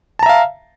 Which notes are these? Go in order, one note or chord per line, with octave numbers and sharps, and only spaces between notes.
E5 F5 A5 A#5